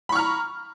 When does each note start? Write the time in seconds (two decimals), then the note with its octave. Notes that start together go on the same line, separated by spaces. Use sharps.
0.09 B5
0.12 C#6
0.15 F6
0.19 A#5